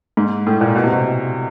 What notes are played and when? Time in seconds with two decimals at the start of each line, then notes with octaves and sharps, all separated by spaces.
0.17 G#2
0.47 A2
0.61 A#2
0.75 B2
0.84 C3
0.92 B2